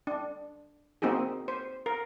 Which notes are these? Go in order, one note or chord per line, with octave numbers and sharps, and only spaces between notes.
D4
A#3 C4 D#4 F#4 G#4
C5
A#4